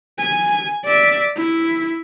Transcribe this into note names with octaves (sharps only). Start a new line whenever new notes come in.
G#5
D5 E5
E4